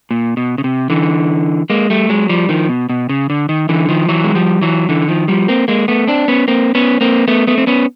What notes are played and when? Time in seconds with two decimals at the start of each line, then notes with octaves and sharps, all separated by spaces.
0.11 A#2
0.37 B2
0.58 C#3
0.64 C3
0.90 D3 E3
1.70 G#3 A#3
1.90 G3 A3
2.09 F#3 G#3
2.29 F3 G3
2.49 D#3 F3
2.69 B2
2.89 B2
3.09 C#3
3.30 D3
3.49 D#3
3.69 D3 E3
3.89 D#3 F3
4.08 E3 F#3
4.24 G#3
4.35 F3 G3
4.61 E3 F#3
4.89 D3 E3
5.08 D#3 F3
5.28 F3 G3
5.48 A#3 C4
5.68 G#3 A#3
5.88 A3 B3
6.07 C4 D4
6.28 B3 C#4
6.48 A#3 C4
6.75 B3 C#4
7.01 A#3 C4
7.28 A3 B3
7.47 A3 B3
7.58 C4
7.67 B3 C#4